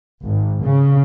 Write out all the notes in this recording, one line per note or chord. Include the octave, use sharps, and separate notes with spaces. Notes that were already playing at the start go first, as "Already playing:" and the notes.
G#1
C#3